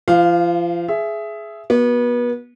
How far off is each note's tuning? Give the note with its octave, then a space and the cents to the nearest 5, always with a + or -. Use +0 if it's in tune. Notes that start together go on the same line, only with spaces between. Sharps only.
F3 -35 F5 +0
G#4 +15 E5 +15
B3 -30 F#4 +0